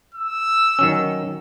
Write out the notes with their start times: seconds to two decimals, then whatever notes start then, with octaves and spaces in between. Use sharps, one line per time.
0.15 E6
0.79 D#3 F#3 C#4